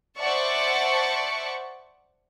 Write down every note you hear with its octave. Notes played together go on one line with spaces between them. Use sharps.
C5 D5 E5 F#5 A5 C#6